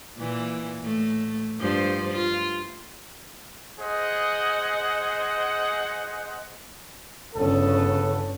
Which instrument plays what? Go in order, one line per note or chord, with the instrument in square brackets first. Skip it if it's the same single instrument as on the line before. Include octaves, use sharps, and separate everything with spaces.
[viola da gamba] A#2 E3
A2 A3
G2 F3 C5
F4
[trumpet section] G#4 C5 D#5 F#5
[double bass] G1 C#4 [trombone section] C#3 B3 A4